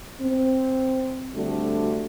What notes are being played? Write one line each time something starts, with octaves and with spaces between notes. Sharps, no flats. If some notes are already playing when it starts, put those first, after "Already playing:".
C4
D3 G3 A3 C4 D4 F#4